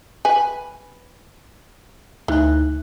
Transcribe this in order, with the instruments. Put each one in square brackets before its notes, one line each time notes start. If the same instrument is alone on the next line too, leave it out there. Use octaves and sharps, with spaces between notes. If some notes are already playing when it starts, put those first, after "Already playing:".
[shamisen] B4 G#5
[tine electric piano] D2 D#4 F#6 [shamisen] E3